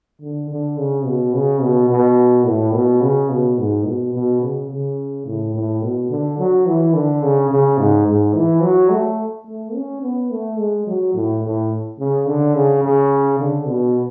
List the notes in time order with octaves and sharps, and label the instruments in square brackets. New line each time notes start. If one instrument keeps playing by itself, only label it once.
[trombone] D3
D3
C#3
B2
C#3
B2
B2
A2
B2
C#3
B2
G#2
B2
B2
C#3
C#3
A2
A2
B2
D3
F#3
E3
D3
C#3
C#3
G#2
G#2
E3
F#3
A3
A3
C#4
B3
A3
G#3
F#3
A2
A2
C#3
D3
C#3
C#3
D3
B2